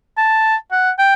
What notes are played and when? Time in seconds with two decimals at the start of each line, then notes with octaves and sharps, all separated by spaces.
0.18 A5
0.72 F#5
0.99 G5